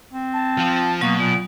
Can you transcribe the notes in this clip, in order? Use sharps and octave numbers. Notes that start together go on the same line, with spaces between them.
C4
A5
F3 F4
B2 F#3 A#3 C#6 D#6
A#2 D7